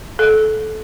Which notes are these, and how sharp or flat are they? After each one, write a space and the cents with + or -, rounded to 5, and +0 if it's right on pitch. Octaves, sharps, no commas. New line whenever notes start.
A4 -20